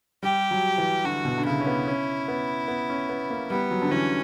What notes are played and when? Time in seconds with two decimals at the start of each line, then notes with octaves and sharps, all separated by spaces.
0.23 G3 G4
0.51 F#3
0.78 E3
1.04 D3 F#4
1.25 B2
1.38 D3
1.46 C#3 E4
1.61 C#4
1.67 B3
1.87 C#4
2.28 B3
2.68 B3
2.90 C#4
3.09 B3
3.30 A#3
3.50 G3 B3
3.71 F#3
3.82 D3
3.91 E3 C#4